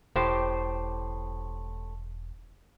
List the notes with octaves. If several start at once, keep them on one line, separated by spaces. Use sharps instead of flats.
E1 A2 G4 C5